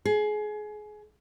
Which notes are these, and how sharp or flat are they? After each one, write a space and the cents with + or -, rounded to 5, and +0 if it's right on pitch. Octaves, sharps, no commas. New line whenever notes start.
G#4 +25